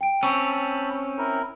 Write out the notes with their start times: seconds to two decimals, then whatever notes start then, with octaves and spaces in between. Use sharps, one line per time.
0.01 G5 D7
0.23 C4 C#4 A5 B5 C#6 E6
1.18 E4 A#4